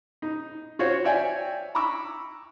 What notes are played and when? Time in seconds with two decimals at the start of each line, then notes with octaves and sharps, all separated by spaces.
0.22 D#4
0.79 F4 F#4 C5 C#5
1.04 C#5 D5 E5 G5 G#5
1.75 A#5 B5 C#6 D6 E6